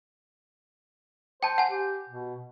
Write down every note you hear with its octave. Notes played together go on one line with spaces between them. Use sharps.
C5 G5 A5
F#5 G#5
G4
B2